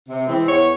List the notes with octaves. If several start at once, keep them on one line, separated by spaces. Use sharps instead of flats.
C3
E3 G#3 C4
E2 C#5